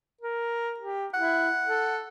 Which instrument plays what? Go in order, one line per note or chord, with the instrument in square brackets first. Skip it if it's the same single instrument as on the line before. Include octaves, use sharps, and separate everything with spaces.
[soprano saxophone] A#4
G4
[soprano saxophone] E4 [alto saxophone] F#5
[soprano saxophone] A4